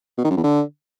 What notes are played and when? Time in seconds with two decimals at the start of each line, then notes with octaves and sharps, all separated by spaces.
0.18 B2
0.24 D#3
0.31 F#2
0.37 E2
0.43 D3